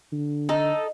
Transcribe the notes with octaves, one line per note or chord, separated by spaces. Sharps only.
D3
D#4 A4